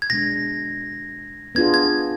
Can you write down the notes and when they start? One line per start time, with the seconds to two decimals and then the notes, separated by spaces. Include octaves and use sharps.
0.02 G#6
0.10 B2 G#3 D4 A#6
1.55 B3 D4 F4 G#4 G#6
1.74 G#6